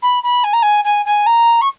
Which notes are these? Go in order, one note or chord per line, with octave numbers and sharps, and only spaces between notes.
B5
B5
G#5
A#5
G#5
G#5
G#5
A#5
C#6